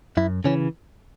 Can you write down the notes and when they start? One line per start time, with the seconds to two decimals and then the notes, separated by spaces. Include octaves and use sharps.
0.17 F#2 E4
0.44 C#3 E3 C#4